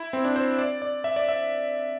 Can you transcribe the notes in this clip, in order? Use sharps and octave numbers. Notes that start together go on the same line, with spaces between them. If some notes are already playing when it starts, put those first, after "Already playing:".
Already playing: E4
C4
D4
C5
D5
D5
E5
D5
E5